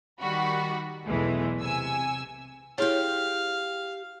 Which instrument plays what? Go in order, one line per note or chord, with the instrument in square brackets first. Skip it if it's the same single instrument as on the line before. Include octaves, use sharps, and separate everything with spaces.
[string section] D#3 G3 F#4 B5
B1 E2 E3 G#3 A3
C3 G#5 E6
[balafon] E4 G#4 C#5 [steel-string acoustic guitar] G4 G5 [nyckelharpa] F5